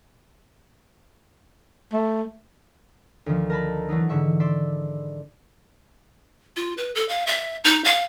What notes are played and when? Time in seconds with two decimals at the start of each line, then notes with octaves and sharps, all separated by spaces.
1.93 A3
3.26 D2 D#3 F3
3.50 A#4 A5 B5
3.89 E3 F#3 A3 D#4
4.09 G#2 D3 E5 C#6
4.40 D5 E5 C6
6.56 F4
6.78 B4
6.95 A4
7.09 F5
7.27 E5
7.64 D#4
7.85 F5